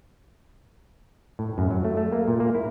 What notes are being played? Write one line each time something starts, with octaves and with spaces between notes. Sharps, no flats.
A2
F#2
F#3
A3
A3
A#3
A#2
A#3
E4